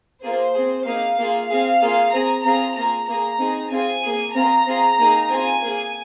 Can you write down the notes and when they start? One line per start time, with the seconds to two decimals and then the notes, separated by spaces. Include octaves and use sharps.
0.23 A#3 F4 G#4 C5
0.54 C4 G#4
0.86 A#3 D#4 G#4 F5
1.18 A#3 F4 G#4
1.50 C4 G#4 F5
1.81 A#3 F4 G#4
2.13 C4 G#4 A#5
2.44 C4 F4 G#4 A#5
2.76 A#3 F4 G#4 A#5
3.08 A#3 G#4 A#5
3.39 C4 D#4 G#4
3.71 C4 F4 G#4 G#5
4.03 A#3 G#4
4.35 C4 F4 G#4 A#5
4.67 C4 F4 G#4
4.98 A#3 D#4 G#4
5.29 C4 F4 G#4 G#5
5.61 A#3 G#4